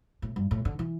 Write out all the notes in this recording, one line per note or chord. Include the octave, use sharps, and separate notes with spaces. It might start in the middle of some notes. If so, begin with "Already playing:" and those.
A2
G2
A2
D3
E3